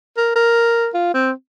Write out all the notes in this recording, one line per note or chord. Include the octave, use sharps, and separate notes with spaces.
A#4
A#4
F4
C4